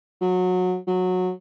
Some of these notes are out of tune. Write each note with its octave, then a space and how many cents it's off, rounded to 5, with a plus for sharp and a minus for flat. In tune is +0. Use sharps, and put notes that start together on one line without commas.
F#3 -20
F#3 -15